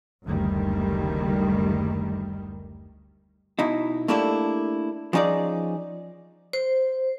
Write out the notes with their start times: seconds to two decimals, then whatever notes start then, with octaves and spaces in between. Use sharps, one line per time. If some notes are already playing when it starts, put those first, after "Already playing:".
0.24 F#1 D2 D#3 G3
3.59 B2 D#4 E4
4.08 A3 A#3 D4 E4 G4 A4
5.13 F3 C#4 D#4 G#4 D5
6.53 C5